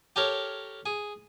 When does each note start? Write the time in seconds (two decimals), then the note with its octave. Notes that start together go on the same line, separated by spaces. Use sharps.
0.16 G4 A4 A#4 C#5
0.86 G#4